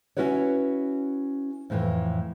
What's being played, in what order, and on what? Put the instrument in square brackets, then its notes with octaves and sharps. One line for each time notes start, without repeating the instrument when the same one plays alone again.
[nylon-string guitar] C#4 E4 F#4 B4 C#5
F2 A2 E3